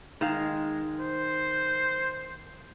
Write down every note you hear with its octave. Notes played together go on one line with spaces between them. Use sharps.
D#3 G#3 F5
C5